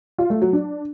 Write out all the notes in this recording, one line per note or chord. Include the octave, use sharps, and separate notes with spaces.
F4
A3
F#3
D4